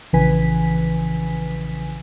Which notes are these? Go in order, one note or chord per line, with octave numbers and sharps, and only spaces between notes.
A#1 C#3 E3 B4 G#5 B6